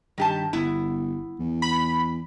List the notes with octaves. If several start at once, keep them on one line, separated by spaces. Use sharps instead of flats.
G2 D#3 G4 A5
G1 B3 E4
E2
B5